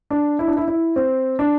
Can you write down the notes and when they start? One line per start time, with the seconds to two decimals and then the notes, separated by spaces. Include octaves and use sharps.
0.10 D4
0.39 E4
0.48 D4
0.57 E4
0.68 E4
0.96 C4
1.39 D4